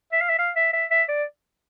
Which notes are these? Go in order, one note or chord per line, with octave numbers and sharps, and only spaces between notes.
E5
F5
E5
F5
E5
E5
E5
D5